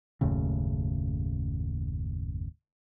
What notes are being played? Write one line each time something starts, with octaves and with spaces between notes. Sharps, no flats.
F#1 D#2 A2 C#3